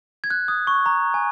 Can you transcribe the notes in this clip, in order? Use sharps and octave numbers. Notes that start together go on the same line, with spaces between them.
G#6
F#6
D#6
C#6
A#5
G#5